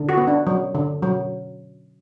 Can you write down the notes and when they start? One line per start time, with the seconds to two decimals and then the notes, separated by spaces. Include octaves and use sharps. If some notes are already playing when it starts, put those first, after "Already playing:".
Already playing: D3
0.09 F#4
0.17 B3
0.27 D4
0.47 F#3
0.75 D3
1.02 F#3